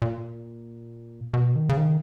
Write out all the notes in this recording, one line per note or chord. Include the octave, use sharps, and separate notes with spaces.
A#2
B2
D#3
C#3
D#3